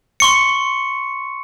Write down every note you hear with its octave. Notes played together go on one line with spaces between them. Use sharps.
C6 C#6 C#7